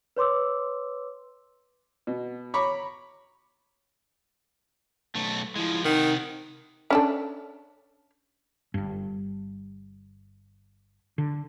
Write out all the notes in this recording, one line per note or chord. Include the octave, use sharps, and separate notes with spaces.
B4 C#5 C6 D6 E6
B2
C#5 A#5 B5 C#6 D6
B1 A3
F3 G#3 E4
C3 D#3 D#4 F#5
C#4 D4 A4
G1 G2
D3